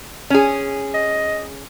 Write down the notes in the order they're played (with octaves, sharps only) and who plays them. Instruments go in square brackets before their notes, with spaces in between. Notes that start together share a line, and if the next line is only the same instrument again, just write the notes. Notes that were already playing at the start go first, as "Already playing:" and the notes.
[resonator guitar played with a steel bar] C#4 G#4
[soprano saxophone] D#5